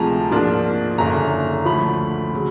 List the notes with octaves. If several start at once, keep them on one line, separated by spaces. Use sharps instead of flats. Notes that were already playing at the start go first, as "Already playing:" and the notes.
Already playing: D2 C3 F3 G#3 A5 A#5
G#2 F3 A#3 D4 F4
F#1 F#2 D3 A#5
D2 D3 F3 B5
C#3 F#3